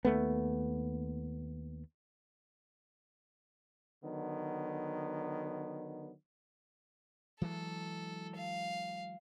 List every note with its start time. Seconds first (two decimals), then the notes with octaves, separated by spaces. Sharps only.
0.05 D#2 A3 B3
4.04 D3 D#3 F#3 B3
7.41 E3 F#3 G#3 A4
8.35 F5